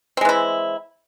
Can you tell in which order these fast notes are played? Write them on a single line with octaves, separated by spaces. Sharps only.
C4 G#3 E3 E4